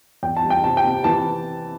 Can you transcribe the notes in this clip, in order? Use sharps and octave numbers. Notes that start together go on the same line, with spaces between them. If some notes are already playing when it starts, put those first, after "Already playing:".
E2 G5
A5
G3
G5
C3 A5
G5
C3
E3 A5